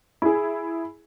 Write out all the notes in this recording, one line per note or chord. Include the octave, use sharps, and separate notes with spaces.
E4 G#4